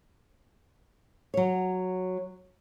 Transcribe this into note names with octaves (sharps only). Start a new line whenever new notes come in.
F#3 C#5